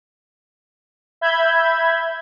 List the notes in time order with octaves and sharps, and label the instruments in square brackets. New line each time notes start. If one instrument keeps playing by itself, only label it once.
[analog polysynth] E5 B5 G6 G#6